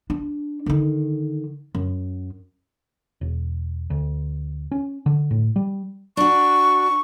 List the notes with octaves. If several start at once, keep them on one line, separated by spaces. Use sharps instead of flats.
D4
D3 D#3
F#2
E1
D2
C#4
D3
A2
G3
D4 F#4 C#6